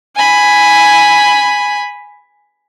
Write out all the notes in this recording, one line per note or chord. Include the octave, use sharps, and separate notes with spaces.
G#5 B5